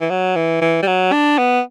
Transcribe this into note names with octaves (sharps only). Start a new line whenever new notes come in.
E3
F#3
E3
E3
G3
F#3
D4
B3